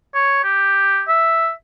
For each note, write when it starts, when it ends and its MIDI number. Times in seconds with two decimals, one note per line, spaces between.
0.15 0.41 73
0.44 1.02 67
1.08 1.51 76